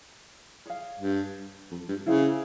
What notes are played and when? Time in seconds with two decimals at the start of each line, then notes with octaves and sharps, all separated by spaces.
0.66 G#4 C#5 F5
1.00 G2
1.71 F2
1.88 G2
2.06 C#3 E4 G#4 C5 F5